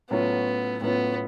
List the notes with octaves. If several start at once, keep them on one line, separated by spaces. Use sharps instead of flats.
A2 F#3 B3 C#4 F4
A2 F#3 B3 C#4 F4